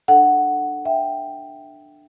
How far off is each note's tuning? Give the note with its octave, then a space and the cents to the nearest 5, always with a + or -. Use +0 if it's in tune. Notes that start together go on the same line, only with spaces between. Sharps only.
D4 +15 A4 +0 F#5 +5
E5 +0 G5 +0